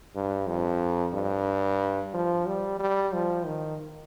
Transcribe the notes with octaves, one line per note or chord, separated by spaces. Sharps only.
G2
F2
G2
F3
G3
G3
F3
D#3